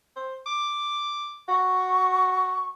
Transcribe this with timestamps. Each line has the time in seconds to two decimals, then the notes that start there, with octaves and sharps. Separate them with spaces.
0.16 C5
0.46 D6
1.49 F#4 C#6